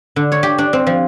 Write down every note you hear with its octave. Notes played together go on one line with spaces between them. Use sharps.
D3
C#5
G4
D4
C4
F3